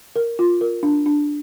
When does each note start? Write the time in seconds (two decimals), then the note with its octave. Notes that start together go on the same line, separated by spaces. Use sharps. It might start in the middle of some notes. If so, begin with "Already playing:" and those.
0.16 A#4
0.39 F4
0.61 A#4
0.83 D4
1.06 D4